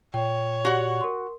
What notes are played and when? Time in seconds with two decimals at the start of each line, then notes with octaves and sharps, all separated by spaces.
0.14 A#2 C#5 G5
0.65 F#4 G4 D5 F#5 F#7
1.01 A#4 C6